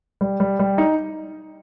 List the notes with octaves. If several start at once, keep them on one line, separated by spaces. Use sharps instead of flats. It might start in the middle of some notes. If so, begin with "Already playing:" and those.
G3
G3
G3
D#4